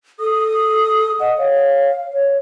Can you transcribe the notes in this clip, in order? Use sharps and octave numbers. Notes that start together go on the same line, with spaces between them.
A4 D#6
D#5 F#5
C#5 F5
C#5